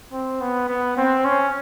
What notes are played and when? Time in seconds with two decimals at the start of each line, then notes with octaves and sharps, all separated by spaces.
0.13 C4
0.41 B3
0.68 B3
0.97 C4
1.25 C#4